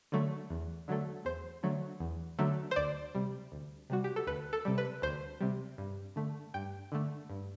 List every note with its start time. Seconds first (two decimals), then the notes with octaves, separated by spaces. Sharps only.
0.12 D3 F#3 A3
0.50 E2
0.88 D3 F#3 A3
1.25 E2 C5
1.63 D3 F#3 A3
2.00 E2
2.39 D3 F#3 A3
2.71 C5
2.76 D2 D5
3.15 C3 G3
3.52 D2
3.90 C3 G3 F#4
4.04 G4
4.16 A4
4.27 D2 B4
4.53 A4
4.65 C3 G3
4.78 B4
5.02 D2 C5
5.41 C3 G3
5.78 G2
6.16 D3 A3
6.54 G2 G5
6.92 D3 A3
7.30 G2